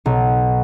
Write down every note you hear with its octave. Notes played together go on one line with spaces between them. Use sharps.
B1